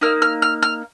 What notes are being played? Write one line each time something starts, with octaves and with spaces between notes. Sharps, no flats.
A#3 D#4 F6
F6
F6
F6